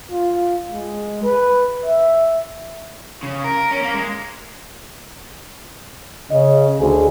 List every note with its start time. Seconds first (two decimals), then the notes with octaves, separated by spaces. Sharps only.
0.11 F4
0.71 G#3
1.23 B4
1.85 E5
3.23 C#3
3.44 A#4
3.71 C#4
3.83 A#3
3.94 G#3
6.31 C#3 D#5
6.78 D2 G#4